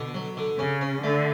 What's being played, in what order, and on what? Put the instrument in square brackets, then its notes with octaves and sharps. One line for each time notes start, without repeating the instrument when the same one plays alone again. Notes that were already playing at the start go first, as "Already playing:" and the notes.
Already playing: [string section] B2 [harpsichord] D3
[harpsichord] F#3
D3
[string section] C#3 [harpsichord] C#4
[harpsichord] C#4
[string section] D3 [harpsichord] A3